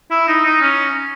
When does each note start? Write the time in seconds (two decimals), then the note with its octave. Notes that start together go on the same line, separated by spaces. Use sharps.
0.11 E4
0.28 D#4
0.45 D#4
0.61 C#4